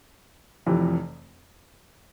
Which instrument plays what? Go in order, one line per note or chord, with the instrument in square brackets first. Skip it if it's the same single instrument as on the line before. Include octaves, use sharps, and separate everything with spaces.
[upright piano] F1 F2 C3 E3